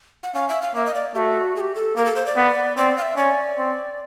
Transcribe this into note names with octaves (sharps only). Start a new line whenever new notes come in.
F#5
C#4 F5
E5
F5
A#3 E5
D#5
D5
A3 F#4 G4
G#4
G4
A4
A#3 A#4
A4
C5
D5
B3
C4 D5
F5
E5
C#4 D5
C4